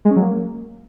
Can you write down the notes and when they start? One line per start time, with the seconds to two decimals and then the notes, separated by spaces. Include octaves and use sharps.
0.05 G#3
0.11 C#4
0.16 F#3
0.22 A#3